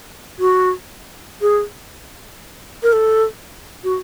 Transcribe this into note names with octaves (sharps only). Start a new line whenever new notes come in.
F#4
G#4
A#4
A4
F#4